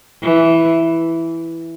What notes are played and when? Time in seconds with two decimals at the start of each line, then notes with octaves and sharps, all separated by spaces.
0.23 E3